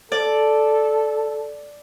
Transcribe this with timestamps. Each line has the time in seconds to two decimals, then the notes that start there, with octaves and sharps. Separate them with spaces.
0.12 A4 D5